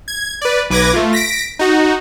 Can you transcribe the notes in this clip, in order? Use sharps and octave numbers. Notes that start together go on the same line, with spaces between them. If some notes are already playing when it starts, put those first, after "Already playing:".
G#6
B4 D5
B1 B4 D6 G#6 A#6
A3 F4
A#6 B6 D7
D#4 F#4